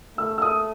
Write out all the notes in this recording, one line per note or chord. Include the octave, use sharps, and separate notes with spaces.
A3 E6
E6
D#6